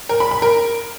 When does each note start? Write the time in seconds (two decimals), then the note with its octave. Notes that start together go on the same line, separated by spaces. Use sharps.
0.09 A#4
0.20 B5
0.31 B5
0.42 A#4